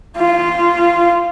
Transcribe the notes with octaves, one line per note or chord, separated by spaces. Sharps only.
F4